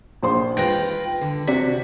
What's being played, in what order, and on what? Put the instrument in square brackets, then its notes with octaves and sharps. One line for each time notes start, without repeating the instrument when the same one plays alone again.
[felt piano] A#1 C5 C6
[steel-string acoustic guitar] F4 B4 G5 [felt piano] A#6
[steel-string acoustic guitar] D3
[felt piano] C3 D5 B6 [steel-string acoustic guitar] F#4